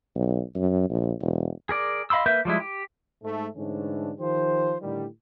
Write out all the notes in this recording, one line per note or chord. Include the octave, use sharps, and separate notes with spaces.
B1
F#2
A#1
E1
G#4 A#4 D5
D#5 F5 B5 C6 E6
A#3 A#4 B4 E5 G6
F3 G3 G#3 E4
G4
G#2 A3
G#2 D3 E3 A3 C#4 D4
D#3 F3 G4 C5
A2 D3 D#3 G3